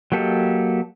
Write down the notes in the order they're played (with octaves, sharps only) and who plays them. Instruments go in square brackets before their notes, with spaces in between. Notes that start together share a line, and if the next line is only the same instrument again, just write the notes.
[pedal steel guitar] F#3 A#3 G4 A4 D#5